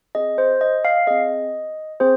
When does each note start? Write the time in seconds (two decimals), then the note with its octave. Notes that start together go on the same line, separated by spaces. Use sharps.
0.15 C4 G#4 D#5
0.38 C5
0.61 D#5
0.85 F5
1.07 C4 G#4 D#5
2.00 C4 G#4 C5